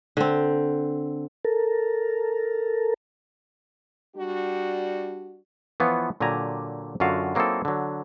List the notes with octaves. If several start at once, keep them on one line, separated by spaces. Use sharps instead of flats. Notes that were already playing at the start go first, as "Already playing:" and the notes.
D3 C4
A4 A#4
G3 D4 F#4
E3 F3 B3 F4 C#5
A#2 D3 F#3 G4 G#5 A#5
F#2 D3 F4 F#4 F5
F#3 A#3 C4 D#4 E4 A4
D3 F#3